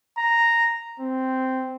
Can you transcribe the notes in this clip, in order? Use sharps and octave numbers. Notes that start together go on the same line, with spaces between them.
A#5
C4